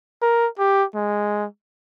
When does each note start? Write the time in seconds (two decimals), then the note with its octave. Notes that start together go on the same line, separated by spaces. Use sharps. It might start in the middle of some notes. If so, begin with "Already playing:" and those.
0.22 A#4
0.59 G4
0.95 G#3